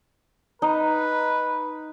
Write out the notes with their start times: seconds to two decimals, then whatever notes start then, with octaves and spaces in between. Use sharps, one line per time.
0.62 D#4 B4